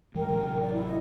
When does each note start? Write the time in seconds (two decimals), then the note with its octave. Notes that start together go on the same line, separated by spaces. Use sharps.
0.15 G#2 E3 G#3 A#4 G5
0.28 A1 C3 F#3
0.60 D5
0.73 E4
0.85 D#5